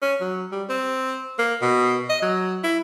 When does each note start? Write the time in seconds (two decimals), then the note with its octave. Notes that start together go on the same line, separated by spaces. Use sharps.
0.02 C#4
0.21 F#3
0.52 G3
0.70 C4
1.39 A#3
1.62 B2
2.09 D#5
2.22 F#3
2.64 E4